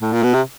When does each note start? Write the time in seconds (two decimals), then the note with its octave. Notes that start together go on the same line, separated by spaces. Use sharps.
0.01 A2
0.13 A#2
0.23 B2
0.34 C3